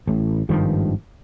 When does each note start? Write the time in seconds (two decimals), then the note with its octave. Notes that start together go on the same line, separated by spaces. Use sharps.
0.07 A1 A2
0.49 G#1 G2 D#3 F3